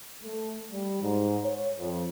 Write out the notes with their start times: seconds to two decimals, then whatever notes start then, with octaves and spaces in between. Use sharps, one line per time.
0.23 A3
0.71 G3
1.02 G#2
1.44 C#5
1.79 F2